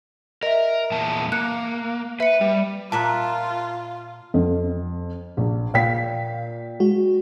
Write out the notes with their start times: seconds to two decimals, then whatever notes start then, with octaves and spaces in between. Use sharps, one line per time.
0.43 A#4 D#5 E5
0.92 E2 A#2 A5
1.32 A#3 F#6 C#7
2.20 B4 E5 C#7
2.41 G3
2.92 A#2 F4 E5 F#5 A5 A#5
4.34 F2
5.37 A#1
5.74 A#2 F5 G5 B6
6.80 G#3 F#4